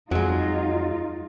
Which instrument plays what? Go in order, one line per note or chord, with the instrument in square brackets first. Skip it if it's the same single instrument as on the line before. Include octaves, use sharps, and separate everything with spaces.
[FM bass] F2 [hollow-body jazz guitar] F#3 G#3 [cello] D#4 F4